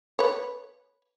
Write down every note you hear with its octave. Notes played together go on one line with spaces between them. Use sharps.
B4 C#5